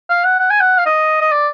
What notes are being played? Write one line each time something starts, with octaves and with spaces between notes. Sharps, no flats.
F5
F#5
F#5
G#5
F#5
F5
D#5
D#5
D5